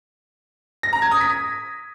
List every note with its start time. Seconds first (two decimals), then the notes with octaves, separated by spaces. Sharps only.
0.83 A#6
0.93 A#5
1.02 G#6
1.11 D#6
1.21 B6